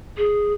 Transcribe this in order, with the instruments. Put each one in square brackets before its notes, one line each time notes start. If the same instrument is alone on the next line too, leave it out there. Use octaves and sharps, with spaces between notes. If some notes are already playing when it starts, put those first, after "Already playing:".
[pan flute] G#4